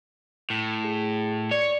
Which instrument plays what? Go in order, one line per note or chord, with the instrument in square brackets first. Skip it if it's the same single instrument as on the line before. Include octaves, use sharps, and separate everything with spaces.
[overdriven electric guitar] A2
[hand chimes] G#4
[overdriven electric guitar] C#5 [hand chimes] D5 C#7